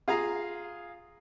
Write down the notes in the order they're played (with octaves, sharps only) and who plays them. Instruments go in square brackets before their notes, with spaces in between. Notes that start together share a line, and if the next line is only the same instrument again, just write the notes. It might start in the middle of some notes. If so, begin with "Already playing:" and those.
[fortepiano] F4 G#4 F5 A#5